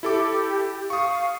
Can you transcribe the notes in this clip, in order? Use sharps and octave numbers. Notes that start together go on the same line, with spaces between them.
E4 G4 A4 D6
F5 C#6 D#6